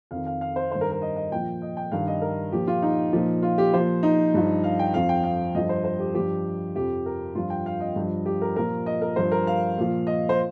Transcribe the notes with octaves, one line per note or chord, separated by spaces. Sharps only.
F2 D#3 F5
F5
F5
C5
G2 D#3 C5
A#4
A#4
D#5
D#5
A#2 F3 G5
D#5
G5
G2 D#3 F5
D#5
A#4
A#2 F3 G4
F4
D#4
A#2 F3
F4
G4
A#2 F3 C5
D#4
G2 F3
F5
G5
F2 F3 F5
G5
F5
G2 F3 D#5
C5
C5
G4
G2 F3 G4
F2 C3 F3 G4
A#4
G2 F3 F4
G5
F5
D#5
G2 F3
G4
A#4
A#2 F3 A#4
D#5
A#4
G2 F3 C5
A#4
F5
A#2 F3
D#5
C5